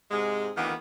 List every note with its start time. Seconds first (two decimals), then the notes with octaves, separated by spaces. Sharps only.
0.11 G#2 C3 G#3
0.57 D2 D#3 E3 A#3 B3